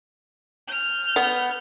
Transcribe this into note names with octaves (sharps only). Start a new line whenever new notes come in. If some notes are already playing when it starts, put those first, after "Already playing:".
F6 G6
B3